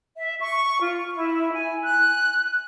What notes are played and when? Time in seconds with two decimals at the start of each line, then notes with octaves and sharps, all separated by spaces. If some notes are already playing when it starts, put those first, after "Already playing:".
0.16 E5
0.40 C#6
0.79 F4
1.13 E4
1.53 G#5
1.84 F#6